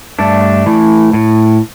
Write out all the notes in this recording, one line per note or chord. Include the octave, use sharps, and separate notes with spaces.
G2 A3 D4
E3 A3
A2